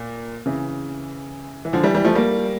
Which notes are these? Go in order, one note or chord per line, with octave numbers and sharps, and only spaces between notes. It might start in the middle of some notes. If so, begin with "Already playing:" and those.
Already playing: A#2
C#3 E3
E3
D3 F3
E3 G3
E3 G3
F3 A3
G3 A#3